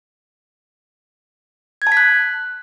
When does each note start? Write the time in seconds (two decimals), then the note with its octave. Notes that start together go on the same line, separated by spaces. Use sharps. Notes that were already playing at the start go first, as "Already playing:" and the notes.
1.82 G#6
1.87 A5
1.92 B6
1.97 F#6